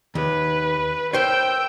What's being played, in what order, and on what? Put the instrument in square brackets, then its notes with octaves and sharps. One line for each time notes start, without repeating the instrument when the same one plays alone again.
[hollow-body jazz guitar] D#2 [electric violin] B4
[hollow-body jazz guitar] A#4 C5 C#5 [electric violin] G5 E6